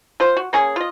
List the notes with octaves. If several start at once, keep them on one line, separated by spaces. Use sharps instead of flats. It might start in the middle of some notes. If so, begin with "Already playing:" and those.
F4 C5
F#4
A#3 C#4 G#4
F4 D#5